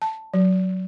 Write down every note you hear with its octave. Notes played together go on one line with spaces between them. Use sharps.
A5
F#3